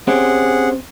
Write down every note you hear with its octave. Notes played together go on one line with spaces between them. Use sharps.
C4 C#4 G4 G#4 F#5